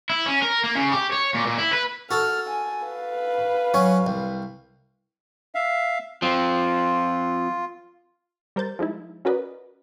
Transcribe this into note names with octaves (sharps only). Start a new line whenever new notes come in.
E4
C#4
A#4
A#3
C#3
G4
C#5
A#2
A#2
E4
B4
F#4 A4 F6
G#5
B4 F5
F#3 C#4 C#5
C2
E5 F5
F3 C4 F4
G3 A#4 C5 G6 A6
F3 G#3 D#4 E4
C#4 F#4 A#4 B4 D5 D#5